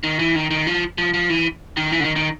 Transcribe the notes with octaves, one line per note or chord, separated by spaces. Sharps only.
D#3
E3
D#3
D#3
F3
F3
F3
E3
D#3
E3
D3
D#3
D#3